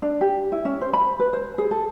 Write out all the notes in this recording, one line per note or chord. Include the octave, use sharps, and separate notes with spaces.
D4
G4
E4
C#4
C5
B5
B4
C5
G#4
A4